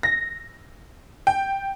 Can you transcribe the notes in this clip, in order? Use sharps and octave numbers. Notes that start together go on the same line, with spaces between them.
A#6
G5